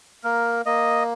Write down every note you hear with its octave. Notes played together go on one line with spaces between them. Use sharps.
A#3 A#4
A#3 D#5